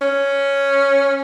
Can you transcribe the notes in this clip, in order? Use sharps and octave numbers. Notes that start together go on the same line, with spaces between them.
C#4